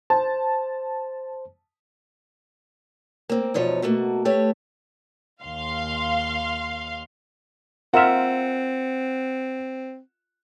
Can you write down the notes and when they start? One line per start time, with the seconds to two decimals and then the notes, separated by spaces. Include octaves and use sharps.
0.10 C5 A5
3.29 A#3 C4
3.54 E2 B2 F3 D#4 C#5
3.82 B2 A3 A#3 F#4
4.25 A3 G4 B4 C#5
5.42 D#2 F5 C6
7.94 C4 F4 A#4 E5 F#5 E7